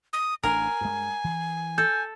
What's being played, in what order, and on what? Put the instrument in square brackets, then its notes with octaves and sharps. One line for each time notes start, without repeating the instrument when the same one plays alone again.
[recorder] D#6
[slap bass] A1 D4 [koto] A#4 [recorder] G#5
[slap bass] G2 G#3
E3
[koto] A4 [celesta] G6